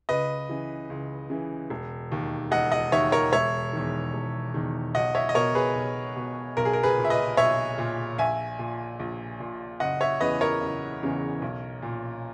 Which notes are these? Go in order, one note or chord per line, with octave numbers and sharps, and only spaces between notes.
C#2 B4 D#5
C#3 E3
C#2
C#3 E3
E1
D#2 D#3
E1 D#5 F#5
D#5 F#5
D#2 D#3 C#5 E5
A#4 C#5
E1 C#5 E5
E2 D#3
E1
E2 D#3
B1 D#5 F#5
C#5 E5
D#5
B2 A#4 C#5
G#4 B4
B1
B2
B1 A#4
G#4
A#4
G#4 B4
A#2
E5
B4 D#5
B1 C#5 E5
A#2
A#1 E5 G#5
A#2
A#1
A#2
F#1 D#5 F#5
C#5 E5
E2 C#3 E3 B4 D#5
A#4 C#5
F#1
E2 C#3 E3
B1
A#2